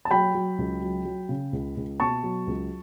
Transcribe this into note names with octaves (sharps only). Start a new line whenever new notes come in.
A5
F#3 G5 B5
F#3
C#2
F#3
F#3
C#3
C#2
C#2
B2 A5 C#6
F#3
C#2